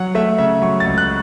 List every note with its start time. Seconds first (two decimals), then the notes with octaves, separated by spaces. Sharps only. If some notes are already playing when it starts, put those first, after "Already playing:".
Already playing: F#3 F#5
0.15 A3 E5
0.38 C#3 E5
0.62 F#3 C#6
0.80 A6
0.86 C#2
0.98 F#6